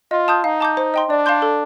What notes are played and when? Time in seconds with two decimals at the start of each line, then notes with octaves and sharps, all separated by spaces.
0.11 F4 D#5
0.28 A5 D#6 G6
0.44 D#4 F5
0.61 A5 D6 G6
0.77 C5
0.94 D#5 G5 C6
1.09 D4 D5
1.26 F5 A5 C6 G6
1.42 A4